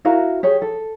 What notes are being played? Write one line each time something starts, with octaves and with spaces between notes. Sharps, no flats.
E4 F#4 A#4 F5
G4 G#4 C#5
A4